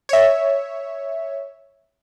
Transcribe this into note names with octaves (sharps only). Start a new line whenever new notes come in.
C#5 E5